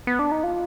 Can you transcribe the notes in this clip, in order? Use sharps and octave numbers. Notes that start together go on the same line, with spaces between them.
B3
D4
D#4
F4